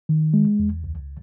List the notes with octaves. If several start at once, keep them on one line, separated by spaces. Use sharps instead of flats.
D#3
G#3
E2
C#2